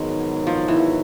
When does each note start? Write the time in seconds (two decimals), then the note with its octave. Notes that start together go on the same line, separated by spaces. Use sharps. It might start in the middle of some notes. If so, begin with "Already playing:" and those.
Already playing: G#2 D#3 F#3 G#3 B3 C#4
0.47 F3
0.68 E3